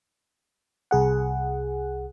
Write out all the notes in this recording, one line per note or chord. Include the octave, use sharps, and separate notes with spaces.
C2 G#4 F#5